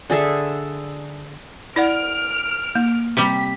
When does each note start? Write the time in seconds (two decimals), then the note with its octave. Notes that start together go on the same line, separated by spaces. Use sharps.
0.10 D3 G#4 A4 E5
1.76 E4 D5 F#5 F6 D7
2.75 A#3
3.17 C3 G3 B6